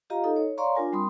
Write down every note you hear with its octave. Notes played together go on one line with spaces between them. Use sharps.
F4 G4 D#5 F5 A#5
D#4 A4 D#5
C#5
C#5 D5 F5 A#5 C6 C#6
D4 F4 A#4 G#5
G3 C4 B5 C6 D#6